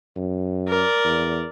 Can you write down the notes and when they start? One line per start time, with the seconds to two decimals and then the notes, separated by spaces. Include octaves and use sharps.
0.16 F#2
0.68 A#4 D5
1.04 E2